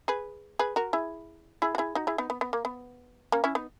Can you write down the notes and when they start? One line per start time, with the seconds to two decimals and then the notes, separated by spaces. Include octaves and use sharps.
0.08 G#4 B4
0.59 G#4 B4
0.76 F#4 A#4
0.93 E4 G#4
1.62 E4 G#4
1.75 F#4
1.78 E4 G#4
1.95 D#4 F#4
2.07 E4 G#4
2.18 B3 D#4
2.30 B3
2.41 B3
2.53 A#3
2.65 B3
3.32 A#3 C#4
3.44 C#4 E4
3.55 B3 D#4